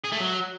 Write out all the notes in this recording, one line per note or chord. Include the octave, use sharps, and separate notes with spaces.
G#4
A3
F#3